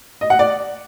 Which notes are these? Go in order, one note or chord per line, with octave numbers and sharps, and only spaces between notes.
D#5
F#5
D5